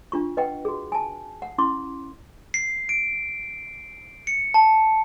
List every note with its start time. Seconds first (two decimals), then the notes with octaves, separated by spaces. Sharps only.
0.12 D4 F4 C#6
0.37 B4 D#5 F#5 G5
0.65 F#4 G#4
0.92 G#5 A5
1.42 F#5
1.58 C#4 E4 C6 D6
2.54 C7
2.89 D7
4.27 C#7
4.54 A5